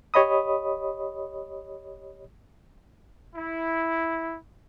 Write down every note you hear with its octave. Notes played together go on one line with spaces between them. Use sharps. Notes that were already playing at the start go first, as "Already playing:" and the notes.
G4 C#5 D#5 B5 D#6
E4